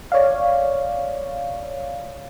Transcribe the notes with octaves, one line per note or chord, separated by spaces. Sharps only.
C#5 D5 F5